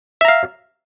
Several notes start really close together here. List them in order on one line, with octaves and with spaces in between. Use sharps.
E5 A#5 F5